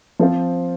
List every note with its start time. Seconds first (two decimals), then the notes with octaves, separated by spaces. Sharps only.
0.20 F3 C4 F4 C5